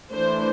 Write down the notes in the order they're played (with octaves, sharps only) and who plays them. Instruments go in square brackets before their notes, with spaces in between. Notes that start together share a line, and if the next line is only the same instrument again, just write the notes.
[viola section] E3 A3 D4 C5